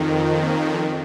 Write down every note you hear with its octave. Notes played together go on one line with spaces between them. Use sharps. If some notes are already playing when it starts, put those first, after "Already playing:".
Already playing: F2 D#3
A#3 C#4